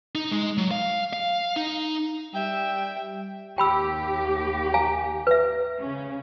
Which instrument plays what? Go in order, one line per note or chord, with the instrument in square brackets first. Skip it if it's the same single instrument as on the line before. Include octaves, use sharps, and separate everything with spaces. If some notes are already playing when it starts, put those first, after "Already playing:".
[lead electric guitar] D#4
G#3
F#3
F5
F5
D#4
[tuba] G3 [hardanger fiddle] E5 [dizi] G5
[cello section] D#2 G4 [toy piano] G5 B5 E6
[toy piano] F5 G#5 A#5
B4 E5
[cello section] C#3 C#4